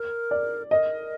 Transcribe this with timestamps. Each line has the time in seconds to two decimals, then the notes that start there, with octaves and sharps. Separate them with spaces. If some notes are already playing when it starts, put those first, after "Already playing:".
Already playing: A#4
0.31 D5
0.71 A#4 D#5